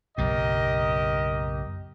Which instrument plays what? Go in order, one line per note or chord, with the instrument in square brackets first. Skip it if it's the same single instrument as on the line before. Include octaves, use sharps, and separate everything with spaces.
[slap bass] F#1 B1 A2 [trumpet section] G4 A#4 D#5